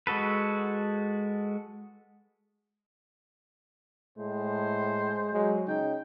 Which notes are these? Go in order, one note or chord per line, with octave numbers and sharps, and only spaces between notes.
G#3 F#4 A4 B4
A2 G#3 C5
F#3 G#3
C#3 D#4 G5